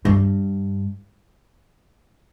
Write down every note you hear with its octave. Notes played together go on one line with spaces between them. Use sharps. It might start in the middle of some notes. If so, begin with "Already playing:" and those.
G2